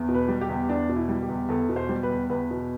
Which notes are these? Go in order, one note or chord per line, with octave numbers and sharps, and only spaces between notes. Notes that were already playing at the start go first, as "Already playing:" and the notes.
Already playing: E2
B2
B4
G3
G4
E2
E2 D4
B2
E4
G3
G4
E2
E2 A4
B2
C5
G3
B4
E2
E2 B4
B2